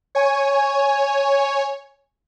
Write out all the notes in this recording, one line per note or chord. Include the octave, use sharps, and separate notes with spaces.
C#5 G#5